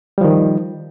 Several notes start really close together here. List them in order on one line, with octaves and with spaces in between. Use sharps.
G3 F3 D#3